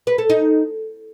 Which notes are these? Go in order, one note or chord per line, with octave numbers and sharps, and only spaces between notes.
B4
A4
D#4